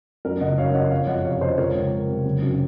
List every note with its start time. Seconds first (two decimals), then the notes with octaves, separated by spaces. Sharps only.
0.25 F#2 A#4
0.41 F#1 D#5 F#5
0.58 F#2 C#5 F5
0.74 F#2 D#5 F#5
0.90 F2 C#5 F5
1.07 F2 D#5 F#5
1.25 C3 C#5 F5
1.41 F2 C5 D#5
1.58 C#2 A#4 C#5
1.75 C#2
1.92 C3
2.08 C3
2.25 F#1
2.42 F#2